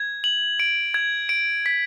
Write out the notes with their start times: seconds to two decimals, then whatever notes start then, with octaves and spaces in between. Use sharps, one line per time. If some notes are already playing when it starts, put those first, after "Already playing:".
Already playing: G#6
0.24 F#7
0.60 D7
0.94 G#6
1.29 D7
1.66 B6